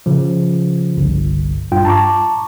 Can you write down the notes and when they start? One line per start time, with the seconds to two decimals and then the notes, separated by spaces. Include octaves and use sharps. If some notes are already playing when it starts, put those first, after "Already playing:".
0.06 C#3 F3
0.97 G1 C2
1.72 G2 F4 G5
1.85 A5 A#5 C#6 D6